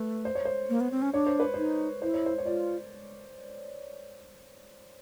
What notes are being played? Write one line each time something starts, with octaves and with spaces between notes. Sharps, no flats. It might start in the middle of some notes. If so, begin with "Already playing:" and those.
Already playing: A3 B4
C5
C#5
C5
A#3
B3
C4
C#4
D4 C#5
C5
B4
D#4 C5
E4 C5
C#5
C5
C#5
F4 D5